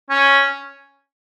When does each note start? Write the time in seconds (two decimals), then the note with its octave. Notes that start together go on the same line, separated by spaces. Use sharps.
0.10 C#4